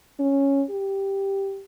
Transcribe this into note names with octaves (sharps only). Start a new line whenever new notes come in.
C#4
G4